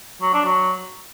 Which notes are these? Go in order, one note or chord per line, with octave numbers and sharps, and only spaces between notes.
F#3
D4
F#3